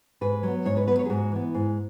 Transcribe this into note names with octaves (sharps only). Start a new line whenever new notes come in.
G#2 B4
F#3 B3
G#2 C#5
B4
F#3 B3 B4
C#5
G#4
G#2 F#4
E3 B3
G#2